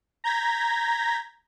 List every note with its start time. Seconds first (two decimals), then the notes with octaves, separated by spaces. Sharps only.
0.24 A#5 G6 G#6 A#6 B6